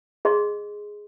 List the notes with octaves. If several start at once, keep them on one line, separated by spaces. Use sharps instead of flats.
G#4 D#5 C6